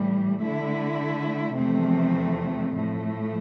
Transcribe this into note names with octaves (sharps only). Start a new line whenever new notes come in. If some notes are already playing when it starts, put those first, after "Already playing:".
Already playing: A2 E3 G3
D3 A3 E4
E2 C3 F3 A3 C4
A2 F3 A3